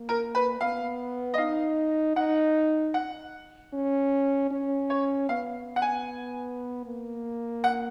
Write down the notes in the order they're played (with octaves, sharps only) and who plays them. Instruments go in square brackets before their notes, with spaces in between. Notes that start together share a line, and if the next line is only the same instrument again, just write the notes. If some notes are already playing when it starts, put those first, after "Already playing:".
Already playing: [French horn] A#3
[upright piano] A#4
B4
[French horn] B3 [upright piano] F5
[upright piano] D#5
[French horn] D#4 [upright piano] F5
[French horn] D#4 [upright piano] F#5
[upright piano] F#5
[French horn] C#4
C#4
[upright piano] C#5
[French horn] B3 [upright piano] F5
[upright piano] F#5
G#5
[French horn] A#3
[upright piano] F#5